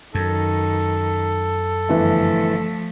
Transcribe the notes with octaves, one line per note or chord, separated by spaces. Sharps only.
F#2 D#3 A4
G1 E3 F3 A3